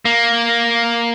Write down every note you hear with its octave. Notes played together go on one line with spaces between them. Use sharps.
A#3